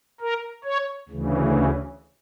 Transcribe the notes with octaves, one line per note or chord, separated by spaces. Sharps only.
A#4
C#5
D2 C#3 E3
C#4